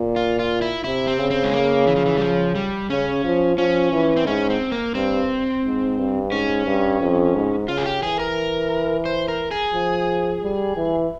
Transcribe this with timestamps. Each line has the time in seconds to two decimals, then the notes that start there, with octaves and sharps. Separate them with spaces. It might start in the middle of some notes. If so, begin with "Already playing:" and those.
Already playing: A#2
0.16 F4
0.39 F4
0.62 E4
0.84 C3 E4
1.07 C4
1.19 C#3
1.31 C4
1.44 G#3
1.53 A#3
1.87 E3
1.96 F3
2.06 E3
2.17 G3
2.21 F3
2.55 G3
2.90 C#3 C#4
3.24 F3
3.57 F3 C#4
3.93 E3
4.16 C4
4.26 G#2 C#4
4.50 C4
4.72 A#3
4.94 G2 C4
5.64 G#2
5.98 G2
6.31 G#2 C#4
6.66 G2
7.01 F2
7.35 G#2
7.68 C#3 F4
7.77 G#4
7.86 G4
8.03 E3 G#4
8.19 A#4
9.05 C5
9.28 A#4
9.51 G#4
9.74 F3
10.42 G3
10.76 E3